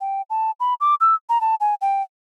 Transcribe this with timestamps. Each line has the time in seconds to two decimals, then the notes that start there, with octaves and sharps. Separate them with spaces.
0.01 G5
0.30 A5
0.60 B5
0.81 D6
1.01 E6
1.29 A#5
1.41 A5
1.60 G#5
1.81 G5